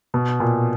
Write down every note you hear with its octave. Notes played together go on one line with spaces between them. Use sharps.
B2
A#2